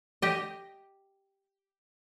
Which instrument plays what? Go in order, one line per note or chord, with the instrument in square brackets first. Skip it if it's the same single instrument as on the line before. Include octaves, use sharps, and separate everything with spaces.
[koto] G4 D#5